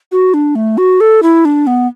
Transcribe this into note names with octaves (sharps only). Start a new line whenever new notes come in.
F#4
D4
A3
F#4
A4
E4
D4
B3